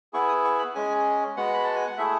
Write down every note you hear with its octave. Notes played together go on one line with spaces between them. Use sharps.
B3 E4 G#4 C#6
D#6
C#6
B5
G#3 C#4 G#4 G#5
G#3 B3 F#4 F#5
B5
A5
G#5
F#5
A3 E4 G#4 E5